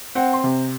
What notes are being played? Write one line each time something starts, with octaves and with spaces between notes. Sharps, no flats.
C4 F#5
C6
C3